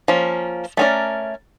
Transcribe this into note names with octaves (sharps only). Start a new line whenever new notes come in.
F3 A#3 C#4
A3 C#4 F4 A#4 D5